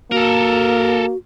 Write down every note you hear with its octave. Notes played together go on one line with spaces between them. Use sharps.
A#3 F#4 A4 A#4